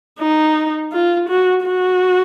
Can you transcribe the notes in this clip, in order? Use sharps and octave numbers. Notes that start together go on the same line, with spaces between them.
D#4
F4
F#4
F#4